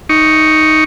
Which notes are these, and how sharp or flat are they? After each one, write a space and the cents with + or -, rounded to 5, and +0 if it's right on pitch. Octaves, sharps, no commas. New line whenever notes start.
D#4 +0 C#6 +0